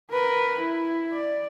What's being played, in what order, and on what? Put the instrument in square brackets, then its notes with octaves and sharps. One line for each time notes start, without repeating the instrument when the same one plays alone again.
[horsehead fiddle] A#4 B4
E4
D5